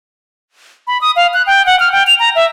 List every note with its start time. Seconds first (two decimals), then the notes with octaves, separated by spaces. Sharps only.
0.87 B5
1.01 D#6
1.16 F5
1.34 F#6
1.47 G5
1.66 F#5
1.80 F6
1.92 G5
2.07 F7
2.19 A#5
2.35 E5